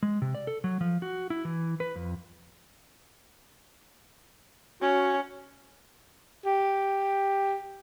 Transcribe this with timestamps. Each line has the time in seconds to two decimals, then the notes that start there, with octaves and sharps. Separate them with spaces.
0.03 G#3
0.22 C3
0.35 D5
0.47 A4
0.64 F#3
0.81 F3
1.02 F#4
1.30 E4
1.45 E3
1.80 B4
1.96 F2
4.82 C#4 F#4
6.45 G4